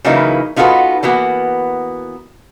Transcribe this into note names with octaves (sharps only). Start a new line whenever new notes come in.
C#3 E3 F#3 A#3 D#4 E4
B3 D#4 F4 F#4 A4 B4
E3 A#3 B3 F#4